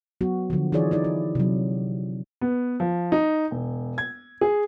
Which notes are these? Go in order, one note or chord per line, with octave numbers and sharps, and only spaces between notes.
F#3 B3 F#4
D3 F3
E3 D#4 F4 G#4 C#5 D5
D#4 E4 D5
E4
C3 F#3
B3
F3
D#4
E1
G#6
G#4